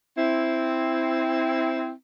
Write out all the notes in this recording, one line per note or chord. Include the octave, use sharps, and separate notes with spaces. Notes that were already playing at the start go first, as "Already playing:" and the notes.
C4 E4